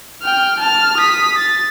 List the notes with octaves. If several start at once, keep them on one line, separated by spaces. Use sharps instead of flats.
G5 F6
A5 F6
D#6 B6
A6